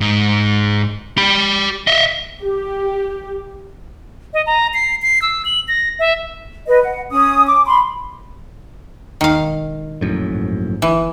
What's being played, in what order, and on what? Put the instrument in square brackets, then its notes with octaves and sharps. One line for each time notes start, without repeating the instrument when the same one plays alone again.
[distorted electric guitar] G#2
G4 B5
D#5 E5
[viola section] G4
[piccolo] D#5
A#5
C7
C7
E6
F#7
A#6
E5
[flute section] B4 D#5
F#5
C#4 D#6
D6
B5 C6
[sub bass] D#2 [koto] D#3 F5
[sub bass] E1
[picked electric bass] A#1 F#2 A2
[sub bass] G#2
[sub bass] G1 [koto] E3